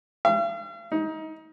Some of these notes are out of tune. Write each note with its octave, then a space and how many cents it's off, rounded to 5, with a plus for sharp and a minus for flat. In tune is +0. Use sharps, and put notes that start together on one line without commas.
F5 -45
D#4 +25